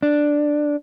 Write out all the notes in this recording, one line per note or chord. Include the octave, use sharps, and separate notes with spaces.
D4